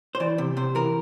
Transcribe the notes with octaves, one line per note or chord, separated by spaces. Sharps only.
C5
E3 D5
C3
C3 C5
E3 A#4